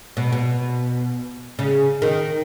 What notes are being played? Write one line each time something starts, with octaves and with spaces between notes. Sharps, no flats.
B2
B2
C#3
D#3